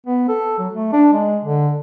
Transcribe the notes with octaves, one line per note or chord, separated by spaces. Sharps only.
B3
A4
F#3
A3
D4
G#3
D3